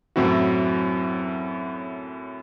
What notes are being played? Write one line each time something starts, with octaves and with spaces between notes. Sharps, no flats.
F#2 A2 F#3 C4 E4 F#4